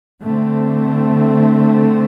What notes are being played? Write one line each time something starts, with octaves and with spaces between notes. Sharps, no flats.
D3 A3 C4